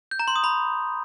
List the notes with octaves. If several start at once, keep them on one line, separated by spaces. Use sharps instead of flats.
G6
A#5
C6
D#6
B5